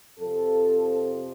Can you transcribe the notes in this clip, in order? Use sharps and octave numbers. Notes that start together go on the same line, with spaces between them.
F2 C3 F3 A4